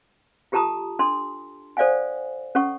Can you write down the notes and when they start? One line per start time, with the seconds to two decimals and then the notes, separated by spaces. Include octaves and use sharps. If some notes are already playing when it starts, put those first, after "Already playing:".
0.52 F4 G4 A4 A5 A#5 D#6
0.99 D4 A4 C6
1.77 A4 C5 D5 F5 F#5 G#5
2.55 C#4 A4 F#5 C#6